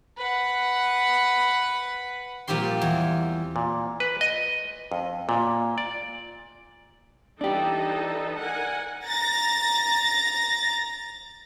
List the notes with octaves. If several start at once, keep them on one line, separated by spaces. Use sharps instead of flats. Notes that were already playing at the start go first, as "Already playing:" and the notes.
B4 F#5
A#2 F3 G3 C4 G4 C6
E2
A#2
B4
D#5
F2
A#2
D5
E3 D4 D#4 G4 A4
A#4 F#5 G#5
A#5 A6 A#6